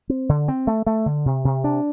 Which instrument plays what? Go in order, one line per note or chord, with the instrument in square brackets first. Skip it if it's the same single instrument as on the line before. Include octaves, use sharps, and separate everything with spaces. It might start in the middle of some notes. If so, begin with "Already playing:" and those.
[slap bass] C4
D3
C4
A3
A3
D3
C3
C3
D4